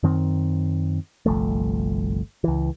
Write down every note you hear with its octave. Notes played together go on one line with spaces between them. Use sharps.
F#2 D#3 C4
G1 C2 F3 A3
C#2 E3